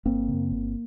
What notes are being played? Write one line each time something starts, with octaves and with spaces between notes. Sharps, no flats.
G1 A#3 C4
F#2 C#3
G1